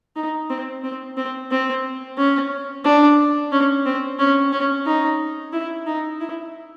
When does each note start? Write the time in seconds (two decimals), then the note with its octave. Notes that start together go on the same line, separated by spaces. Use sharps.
0.16 D#4
0.49 C4
0.83 C4
1.17 C4
1.51 C4
2.17 C#4
2.84 D4
3.52 C#4
3.85 C4
4.19 C#4
4.52 C#4
4.86 D#4
5.53 E4
5.86 D#4
6.20 E4